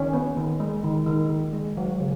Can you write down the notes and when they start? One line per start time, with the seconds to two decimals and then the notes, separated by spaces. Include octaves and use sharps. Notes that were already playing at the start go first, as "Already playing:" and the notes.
Already playing: D#3 C#4
0.13 B3
0.37 D#3
0.60 G#3
0.84 D#3
1.06 D#3
1.30 D#3
1.53 G#3
1.77 F#3
2.00 C#3